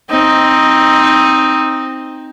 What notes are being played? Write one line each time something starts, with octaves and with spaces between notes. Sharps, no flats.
C4 D#4